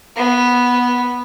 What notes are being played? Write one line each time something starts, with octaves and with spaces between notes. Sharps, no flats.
B3